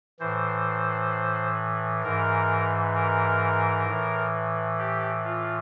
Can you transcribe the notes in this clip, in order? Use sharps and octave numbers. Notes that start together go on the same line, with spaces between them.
A2 E3 C5
G#2 E3 A#4
A#4
A2 E3
G4
F4